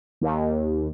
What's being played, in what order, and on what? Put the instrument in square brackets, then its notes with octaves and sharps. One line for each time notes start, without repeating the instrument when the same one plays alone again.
[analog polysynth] D#2